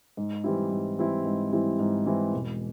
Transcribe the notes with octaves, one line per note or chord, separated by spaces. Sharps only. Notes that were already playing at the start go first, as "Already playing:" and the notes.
G#2
E3 G3 C4 E4
G#2
E3 G3 C4 E4
G#2
E3 G3 C4 E4
G#2
E3 G3 C4 E4
E1